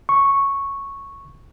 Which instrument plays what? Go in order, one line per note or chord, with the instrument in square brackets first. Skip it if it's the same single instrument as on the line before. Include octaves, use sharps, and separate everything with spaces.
[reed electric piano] C#6